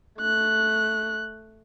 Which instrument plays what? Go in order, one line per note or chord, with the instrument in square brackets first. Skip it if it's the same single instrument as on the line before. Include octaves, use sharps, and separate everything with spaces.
[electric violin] A3 F#6